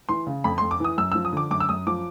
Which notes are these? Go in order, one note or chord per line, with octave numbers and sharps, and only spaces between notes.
E3 C6
C#3
F2 B5
F2 C6
D6
E3 D#6
F#2 E6
F3 E6
D#6
D3 D6
F#2 D6
E6
F#2 D#6
F3 D6